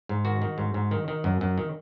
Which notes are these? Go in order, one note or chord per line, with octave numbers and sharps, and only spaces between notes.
G#2
D#3 F#4
D#3
G#2
G#2
D#3
D#3
F#2
F#2
D#3